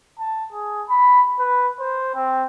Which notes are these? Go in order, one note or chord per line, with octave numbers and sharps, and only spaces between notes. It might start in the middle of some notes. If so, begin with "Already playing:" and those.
A5
G#4
B5
B4
C5
C4